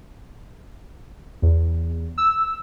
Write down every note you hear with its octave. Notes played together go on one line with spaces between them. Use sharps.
E2
E6